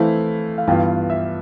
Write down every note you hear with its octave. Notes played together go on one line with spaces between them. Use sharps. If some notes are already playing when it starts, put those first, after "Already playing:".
Already playing: E3 A3 C4 E4 F5
F5
G2 E3 B3 F4 G5
E5